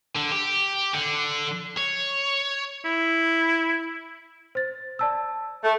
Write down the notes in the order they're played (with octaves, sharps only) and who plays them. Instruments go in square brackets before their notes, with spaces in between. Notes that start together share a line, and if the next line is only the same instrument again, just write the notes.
[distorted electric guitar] D3
G4
D3
C#5
[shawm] E4
[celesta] C5 A6
D5 A5 E6
[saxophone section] A3